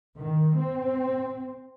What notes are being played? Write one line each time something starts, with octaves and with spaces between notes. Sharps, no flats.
D#3
C4